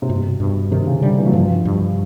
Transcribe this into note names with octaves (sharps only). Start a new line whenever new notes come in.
C3
G2 B2
G2
C3 D#3
C#3
D3 G3
E3
F#3
G2 F3
G2